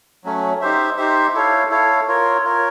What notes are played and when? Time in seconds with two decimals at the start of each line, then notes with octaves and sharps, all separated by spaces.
0.24 F#3 A3 C#4
0.61 D#4 G4 C5 E5
0.97 D#4 G4 C5 E5
1.34 E4 A4 C#5 F5
1.71 E4 A4 C#5 F5
2.08 F4 A#4 C#5
2.44 F4 A#4 C#5